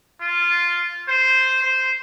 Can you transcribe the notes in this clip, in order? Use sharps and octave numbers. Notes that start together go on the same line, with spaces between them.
F4
C5
C5